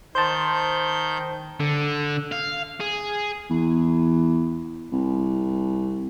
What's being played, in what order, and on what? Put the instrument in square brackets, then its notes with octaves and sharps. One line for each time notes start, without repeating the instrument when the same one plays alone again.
[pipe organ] D#3 G6 [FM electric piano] C5 A5
[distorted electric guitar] D3
F5
G#4
[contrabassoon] E2
C2